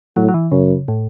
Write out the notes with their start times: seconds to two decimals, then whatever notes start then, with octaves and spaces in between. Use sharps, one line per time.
0.16 A2 F#3
0.28 F#3
0.34 E3
0.52 F#2 C#3
0.88 A2